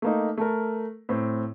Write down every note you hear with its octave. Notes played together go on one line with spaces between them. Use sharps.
A3 A#3 D#4
A3 A4 A#4
A2 C4